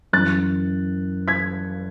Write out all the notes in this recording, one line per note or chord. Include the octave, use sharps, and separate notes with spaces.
F#2 E3 F#6 A6
G#6 B6